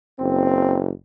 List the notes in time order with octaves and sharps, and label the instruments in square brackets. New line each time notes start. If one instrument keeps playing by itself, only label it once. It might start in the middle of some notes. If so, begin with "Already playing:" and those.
[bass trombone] F#1 [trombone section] C4